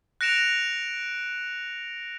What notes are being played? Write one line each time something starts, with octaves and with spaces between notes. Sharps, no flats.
F#6 A#6 C#7 D7 E7 F7